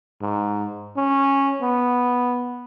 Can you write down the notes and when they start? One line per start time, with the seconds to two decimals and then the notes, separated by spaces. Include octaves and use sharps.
0.22 G#2
0.97 C#4
1.62 B3